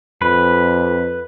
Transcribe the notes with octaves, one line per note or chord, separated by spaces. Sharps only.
F2 B4